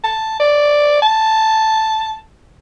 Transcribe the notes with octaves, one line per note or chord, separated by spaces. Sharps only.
A5
D5
A5